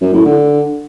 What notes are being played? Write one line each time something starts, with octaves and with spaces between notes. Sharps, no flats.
F#2
A2
D3